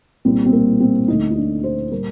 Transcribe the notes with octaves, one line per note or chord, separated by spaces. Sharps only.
C2 A#2 G3 A#3 C4
C4
A#3
C4
D2 D3 A3 D#4
D#4
D4
C5
A#2 G3 A#4